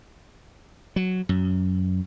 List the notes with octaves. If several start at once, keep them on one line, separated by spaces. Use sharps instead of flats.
F#3
F#2